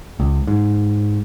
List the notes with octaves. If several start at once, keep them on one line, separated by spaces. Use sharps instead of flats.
C#2
G#2